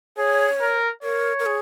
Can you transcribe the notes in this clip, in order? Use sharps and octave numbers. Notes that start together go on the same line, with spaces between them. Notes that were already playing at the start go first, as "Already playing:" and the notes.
G#4 C#5
A#4
A#4 C#5
A#4
G#4